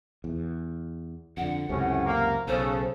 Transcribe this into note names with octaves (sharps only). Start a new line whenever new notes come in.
E2
F2 D3 F#5
C#2 F#2 A2 C3 C#4
A#3
B1 C#3 A4 C5